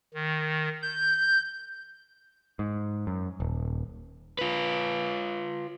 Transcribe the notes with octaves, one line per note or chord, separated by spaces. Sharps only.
D#3
G6
G#2
F#2
D#1
F4 B4